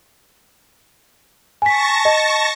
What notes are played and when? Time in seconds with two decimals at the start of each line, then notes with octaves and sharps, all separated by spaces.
1.62 G#5 A5 C#6 A#6 B6
2.05 D#5